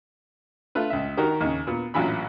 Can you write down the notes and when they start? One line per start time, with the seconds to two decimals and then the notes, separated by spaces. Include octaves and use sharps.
0.75 A3 F4 B4
0.90 C#2 E5
1.17 D#3 F#4 G4 A#4
1.41 D#2 C#3
1.67 A#2 B3
1.94 A1 A#2 E3 F#3 B5